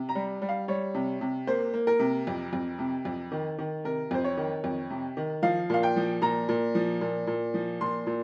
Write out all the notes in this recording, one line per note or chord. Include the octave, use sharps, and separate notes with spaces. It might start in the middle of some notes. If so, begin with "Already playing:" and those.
Already playing: C3
A#5
G3
G3
F5
G3 C#5
C3
C3
A#3 C5
A#3
A#4
C3
F2
F2
C3
F2
D#3
D#3
C3 A#4
F2 C5
C#5
D#3
F2
C3
D#3
F3 F5
A#2 F5
G5
F3
A#2 A#5
A#2
F3
A#2
A#2
F3
A#2 C6
A#2